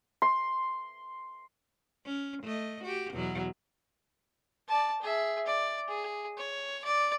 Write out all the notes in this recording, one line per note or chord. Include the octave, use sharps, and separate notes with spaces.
C6
C#4
A3 D#5
F#4 G4
E2 B2 F#3
D5 A5
G#4 E5
D5
G#4
C#5
D5